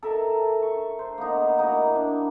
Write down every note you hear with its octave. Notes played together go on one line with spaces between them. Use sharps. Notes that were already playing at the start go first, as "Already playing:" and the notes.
A4 A#4 E5 A#5
C#6
C5
A#3 B3 D#4
A#3 D#4 E4 F#4
D4